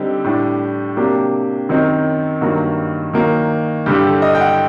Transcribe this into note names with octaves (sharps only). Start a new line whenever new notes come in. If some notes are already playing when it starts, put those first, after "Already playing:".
Already playing: D3 G3 C4 D#4 G4
A2 G3 D4
C3 F#3 A#3 D4 G4
F#2 D#3 F#3 C4 D#4
G2 D#3 F#3 A#3 F#4
D#3 F#3 A#3
G2 D3 G3 G4
A4
D#5
G5
F#5